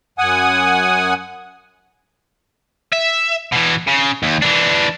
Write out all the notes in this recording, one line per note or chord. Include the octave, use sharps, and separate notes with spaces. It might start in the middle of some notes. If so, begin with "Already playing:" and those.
F#2 F#5 G#5 D#6
E5
B2 E3
C#3
D#2
E3 D4